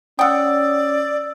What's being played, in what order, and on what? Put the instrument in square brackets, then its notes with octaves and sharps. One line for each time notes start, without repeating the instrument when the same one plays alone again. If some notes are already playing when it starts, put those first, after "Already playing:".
[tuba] C#4 [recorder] D5 [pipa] F#5 G5 [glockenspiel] D#6 E6